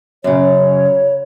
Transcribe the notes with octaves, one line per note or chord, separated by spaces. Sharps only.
F#2 C#3 C#5